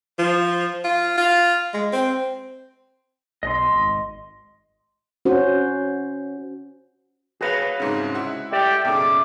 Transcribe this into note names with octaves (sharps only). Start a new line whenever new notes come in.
F3
F4
F4
G#3
C4
B1 D#5 C6
G#1
C#4 F#4 C5
F#4 G#4 B4 C#5 F5
C2 G#2 C#3
G#3 E4 F#5
G4 A4 D5 E5
B1 F#2 C#3 D6